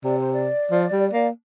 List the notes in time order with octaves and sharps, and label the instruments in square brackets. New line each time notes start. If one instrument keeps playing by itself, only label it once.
[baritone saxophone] C3 [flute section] D5
[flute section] C5
D5
[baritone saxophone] F3
G3
A#3